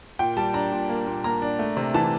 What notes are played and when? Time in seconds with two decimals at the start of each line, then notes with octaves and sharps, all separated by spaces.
0.19 A#2 G5
0.37 G3 A5
0.54 D4 A#5
0.71 A#2
0.89 A#3
1.07 A#2
1.24 A#3 A#5
1.42 D4
1.59 A3
1.77 C3
1.94 E3 A5